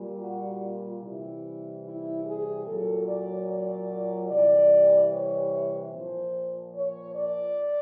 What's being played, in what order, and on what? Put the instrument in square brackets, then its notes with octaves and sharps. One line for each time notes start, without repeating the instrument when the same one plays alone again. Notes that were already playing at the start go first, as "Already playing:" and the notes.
Already playing: [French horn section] A#2 G3
F#4
F4
C3 E3 G3 E4
E4
G#4
A#2 F#3 A4
D5
D5
C3 E3 G3 D5
C#5
A#2 F3 C5
C#5
D5